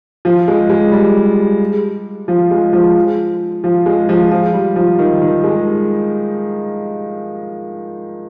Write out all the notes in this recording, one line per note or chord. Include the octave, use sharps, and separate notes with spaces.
F3
G#3
G#3
G3
F3
G#3
F3
F3
G#3
F3
F3
G3
F3
D#3
D#3
G#3